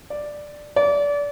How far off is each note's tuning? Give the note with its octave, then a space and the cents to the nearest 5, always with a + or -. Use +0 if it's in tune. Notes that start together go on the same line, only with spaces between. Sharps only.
D5 +5
D5 -25